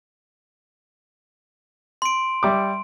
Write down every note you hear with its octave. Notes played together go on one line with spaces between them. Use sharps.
C6 D7
G3 E5 D6